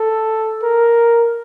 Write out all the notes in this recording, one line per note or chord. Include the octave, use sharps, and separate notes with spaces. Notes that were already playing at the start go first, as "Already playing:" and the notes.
Already playing: A4
A#4